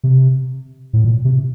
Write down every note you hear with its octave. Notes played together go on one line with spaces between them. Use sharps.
C3
A2
A#2
C3